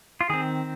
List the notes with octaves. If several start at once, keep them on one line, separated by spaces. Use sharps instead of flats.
F4
D#3 C4 G#4